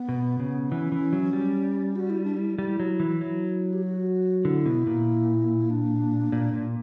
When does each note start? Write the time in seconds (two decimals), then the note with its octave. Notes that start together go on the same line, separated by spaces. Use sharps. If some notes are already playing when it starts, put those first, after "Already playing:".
Already playing: B3
0.09 B2
0.40 C#3
0.71 E3 C#4
0.92 E3
1.13 F#3
1.33 G3
1.96 F#4
2.10 E4
2.24 D4
2.37 E4
2.58 G3 E4
2.80 F#3
3.00 E3
3.21 F#3
3.73 G4
3.83 F#4
4.45 D3 E4
4.66 B2
4.87 A#2
5.70 D4
6.32 A#2
6.53 A#2